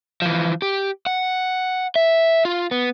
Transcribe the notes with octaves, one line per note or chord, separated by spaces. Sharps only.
E3 F3
G4
F#5
E5
F4
B3